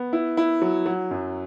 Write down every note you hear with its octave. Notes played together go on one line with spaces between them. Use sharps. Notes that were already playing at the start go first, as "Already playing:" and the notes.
Already playing: B3
E4
E4
F#3
F#3
F#2